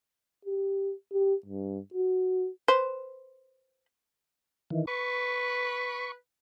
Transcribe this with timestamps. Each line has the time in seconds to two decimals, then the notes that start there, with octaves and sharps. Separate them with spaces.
0.45 G4
1.13 G4
1.46 G2
1.94 F#4
2.68 B4 C5
4.70 D#3 E3
4.87 B4 C#6